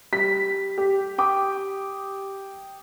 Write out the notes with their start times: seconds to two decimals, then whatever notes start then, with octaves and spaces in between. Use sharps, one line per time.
0.13 G3 B6
0.78 G4
1.18 G5 D6 D#6